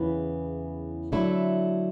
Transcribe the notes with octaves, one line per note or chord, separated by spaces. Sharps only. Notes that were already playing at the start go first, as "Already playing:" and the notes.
Already playing: E2 C#3 E3 B3
D3 F#3 A3 E4